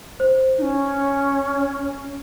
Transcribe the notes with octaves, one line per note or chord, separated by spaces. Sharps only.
C5
D#4
C#4